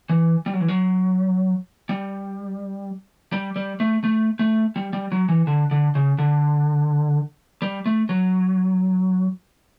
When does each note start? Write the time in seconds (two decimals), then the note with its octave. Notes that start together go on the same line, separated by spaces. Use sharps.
0.09 E3
0.46 G3
0.53 F#3
0.60 E3
0.68 F#3
1.89 G3
3.32 G3
3.56 G3
3.80 A3
4.04 A3
4.39 A3
4.76 G3
4.93 G3
5.12 F#3
5.29 E3
5.47 D3
5.71 D3
5.95 C#3
6.18 D3
7.62 G3
7.86 A3
8.09 F#3